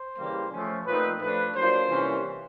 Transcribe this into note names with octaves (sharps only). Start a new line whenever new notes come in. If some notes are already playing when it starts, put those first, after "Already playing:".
Already playing: C5
C#3 E3 G3 A#3
F3 A3 C#4
A#2 F3 A3 C4 D#4 B4
F3 A3 D4 F4 B4
F#3 A#3 D4 F4 C5
C3 E3 G3 A#3 C#4